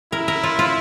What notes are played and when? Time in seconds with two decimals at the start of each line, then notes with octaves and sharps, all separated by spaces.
0.12 E4 A#4
0.28 A#4
0.43 F4
0.59 F4